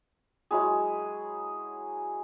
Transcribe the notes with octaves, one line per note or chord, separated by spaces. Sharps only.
F#3 G#3 E4 G#4